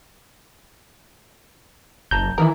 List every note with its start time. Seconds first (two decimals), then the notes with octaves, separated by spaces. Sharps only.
2.11 F#1 A5 A#5 G6
2.38 D#3 E3 E4 F4 A#4